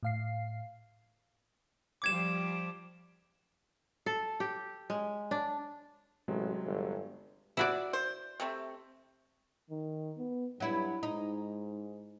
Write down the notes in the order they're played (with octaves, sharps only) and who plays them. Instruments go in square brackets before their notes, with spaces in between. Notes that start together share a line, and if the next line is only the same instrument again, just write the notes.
[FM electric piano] A2 F5 C7
[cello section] F3 G3 [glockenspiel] D6 G#6 E7
[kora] A4
G4
G#3
D4
[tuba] A1 [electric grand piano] C3 F#3 G#3
[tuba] G1
[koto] E4 F#4 D5
[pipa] C5
C3 A3 C4
[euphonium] D#3
B3
[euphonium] G2 [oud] F#3 E4
[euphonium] G#2 [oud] D#4